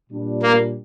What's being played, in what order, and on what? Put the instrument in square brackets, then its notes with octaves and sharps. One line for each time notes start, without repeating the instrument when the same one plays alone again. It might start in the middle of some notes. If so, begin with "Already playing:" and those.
[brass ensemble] A#2 G3 D4
[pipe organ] A#3